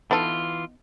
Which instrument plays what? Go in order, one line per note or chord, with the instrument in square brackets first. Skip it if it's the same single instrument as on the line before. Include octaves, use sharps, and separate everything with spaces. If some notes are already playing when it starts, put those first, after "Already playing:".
[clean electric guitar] E3 F4 [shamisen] B3 D#4 A4